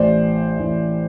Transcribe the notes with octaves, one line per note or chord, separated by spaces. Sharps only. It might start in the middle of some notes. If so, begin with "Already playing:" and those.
Already playing: A1 A2 E3 C5 D5
A1 A2 E3